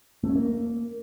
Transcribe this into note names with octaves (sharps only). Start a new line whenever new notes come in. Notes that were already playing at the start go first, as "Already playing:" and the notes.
A3
C#4
A#3